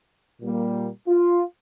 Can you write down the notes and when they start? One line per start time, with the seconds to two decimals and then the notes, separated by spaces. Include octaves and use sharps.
0.41 A#2 G3 A#3
1.08 F4